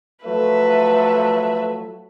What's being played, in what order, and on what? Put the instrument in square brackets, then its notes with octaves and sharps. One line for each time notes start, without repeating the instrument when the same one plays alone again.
[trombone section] F3 F#3 A3 [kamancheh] B4 E5